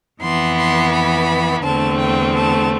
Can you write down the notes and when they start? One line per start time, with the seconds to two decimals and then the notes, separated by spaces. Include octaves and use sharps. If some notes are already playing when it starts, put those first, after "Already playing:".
0.21 F2 E3 B3 C6
0.58 C6
0.92 B5
1.64 E2 D3 A3 C4 A5
1.99 G5
2.35 A5